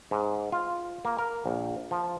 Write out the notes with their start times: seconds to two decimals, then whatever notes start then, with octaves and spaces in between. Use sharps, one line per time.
0.11 G#2
0.52 F4
1.05 A#3
1.19 A#4
1.46 A#1
1.91 F3